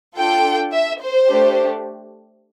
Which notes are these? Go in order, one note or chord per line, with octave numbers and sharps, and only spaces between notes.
D4 F4 A4 G5
E5
C5
A3 D4 G4